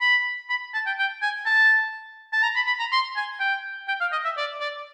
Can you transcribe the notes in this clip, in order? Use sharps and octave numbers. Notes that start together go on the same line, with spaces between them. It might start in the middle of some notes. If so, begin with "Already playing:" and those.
B5
B5
A5
G5
G5
G#5
A5
A5
A#5
B5
B5
A#5
C6
G#5
G5
G5
F5
D#5
E5
D5
D5